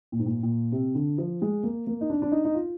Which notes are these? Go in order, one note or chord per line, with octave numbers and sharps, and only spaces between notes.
A#2
G#2
A#2
A#2
C3
D3
F3
G#3
A#3
A#3
D#4
D4
D4
D#4
D#4
F4